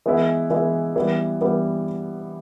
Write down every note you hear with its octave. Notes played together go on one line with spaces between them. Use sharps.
E3 G#3 B3 E4
E3 G#3 B3 E4
E3 G3 B3
E3 G3 B3